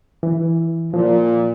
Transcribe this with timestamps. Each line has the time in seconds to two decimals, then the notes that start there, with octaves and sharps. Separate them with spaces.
0.23 E3
0.94 A#2 F3